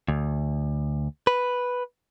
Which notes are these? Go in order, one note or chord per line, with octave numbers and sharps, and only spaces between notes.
D2
B4